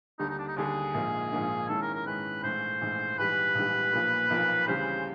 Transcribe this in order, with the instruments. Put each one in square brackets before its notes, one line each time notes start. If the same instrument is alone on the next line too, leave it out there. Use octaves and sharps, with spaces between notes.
[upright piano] D#2 D3 G3 [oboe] D#4
[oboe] D#4
D4
D#4
[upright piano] D#2 D3 G3 [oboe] G#4
[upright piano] A#1 G#2 F3 A#3 D#4
A#1 G#2 F3 A#3 D#4
[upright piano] G#2 D#3 G#3 C#4 E4 [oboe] A4
[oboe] A#4
A#4
[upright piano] G#2 D#3 G#3 C#4 E4 [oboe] B4
[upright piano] A#1 G#2 E3 A3 [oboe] C5
[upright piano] A#1 G#2 E3 A3
[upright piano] A#1 G#2 E3 G3 [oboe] B4
[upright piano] A#1 G#2 E3 G3
B1 A#2 F3 A#3
B1 A#2 F3 A#3
[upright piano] D2 C#3 E3 G3 [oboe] C5